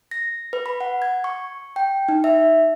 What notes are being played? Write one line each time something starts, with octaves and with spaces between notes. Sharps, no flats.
A#6
B4
B5
F#5
G#6
C#6
G5
D#4
E5